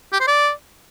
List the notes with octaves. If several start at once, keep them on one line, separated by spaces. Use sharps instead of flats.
G4
C5
D5